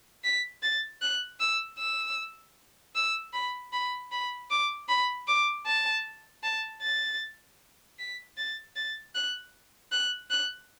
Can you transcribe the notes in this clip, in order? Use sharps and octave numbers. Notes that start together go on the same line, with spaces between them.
B6
A6
F#6
E6
E6
E6
B5
B5
B5
D6
B5
D6
A5
A5
A6
B6
A6
A6
F#6
F#6
F#6